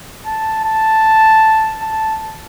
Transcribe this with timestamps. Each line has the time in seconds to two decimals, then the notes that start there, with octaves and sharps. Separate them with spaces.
0.26 A5
0.65 A5
1.82 A5